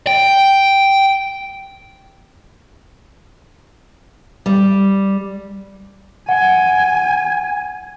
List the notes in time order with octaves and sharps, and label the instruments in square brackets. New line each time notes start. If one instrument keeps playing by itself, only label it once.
[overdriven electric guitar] G5
[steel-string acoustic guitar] G3
[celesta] F#5 [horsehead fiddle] G#5